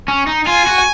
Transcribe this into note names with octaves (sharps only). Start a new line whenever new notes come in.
C#4
D#4
F4 G#5
F#4